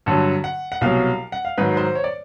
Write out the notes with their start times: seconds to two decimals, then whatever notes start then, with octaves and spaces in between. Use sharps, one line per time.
0.06 G2 D3 F#3
0.44 F#5
0.72 F#5
0.81 C2 B2 F#3 F5
1.32 F#5
1.45 F5
1.58 G#2 D#3 F#3 B4
1.77 C5
1.95 C#5
2.04 D5